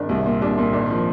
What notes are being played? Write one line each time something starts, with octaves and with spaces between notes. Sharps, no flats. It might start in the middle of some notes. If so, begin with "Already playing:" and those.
Already playing: G#1 D4
C2
A#2
C2 D4
A#2
G#1 D4
F3